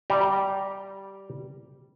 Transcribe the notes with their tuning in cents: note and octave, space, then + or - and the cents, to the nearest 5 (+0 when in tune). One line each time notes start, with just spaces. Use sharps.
G3 -10 G5 +0 A#5 +0